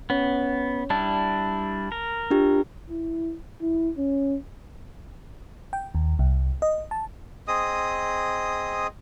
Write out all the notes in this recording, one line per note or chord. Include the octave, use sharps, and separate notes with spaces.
B3 C#4 C#5
G3 D4 E4 A5
A#4
D4 F4 G4
E4
E4
C#4
G5
D#2
C2
D#5
A5
C4 G#4 D#5 D#6